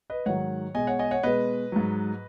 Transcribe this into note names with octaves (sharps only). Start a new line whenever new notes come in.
B4 D#5
G#2 D#3 F#3 C#5 F#5
B2 G#3 D#5 G#5
C#5 F#5
D#5 G#5
C#5 F#5
B2 G#3 B4 D#5
G#2 F#3